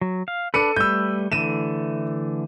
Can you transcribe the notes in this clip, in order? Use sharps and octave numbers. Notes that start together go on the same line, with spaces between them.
F#3
F5
D4 A4 B4 C#7 D#7
G3 A3 B4 E6 G6
D3 E3 A3 D#7 E7